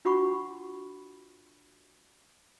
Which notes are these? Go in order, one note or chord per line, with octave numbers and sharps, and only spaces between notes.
D4 F4 F#4 F#5 B5 C#6